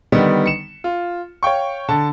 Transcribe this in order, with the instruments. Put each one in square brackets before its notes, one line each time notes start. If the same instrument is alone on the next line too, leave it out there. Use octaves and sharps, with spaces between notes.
[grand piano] D3 D#3 G3 B3
C#7 E7
F4
C#5 F5 G5 C#6
D3 A5